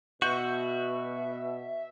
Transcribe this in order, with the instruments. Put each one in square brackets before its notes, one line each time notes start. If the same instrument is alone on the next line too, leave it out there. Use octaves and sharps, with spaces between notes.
[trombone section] B2 [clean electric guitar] F#4 [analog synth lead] E5 [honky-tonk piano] C#6 G6